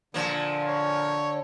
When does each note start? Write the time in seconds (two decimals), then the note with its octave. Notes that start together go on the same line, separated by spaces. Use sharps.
0.14 A#2 D3 F3 A#3
0.68 C#5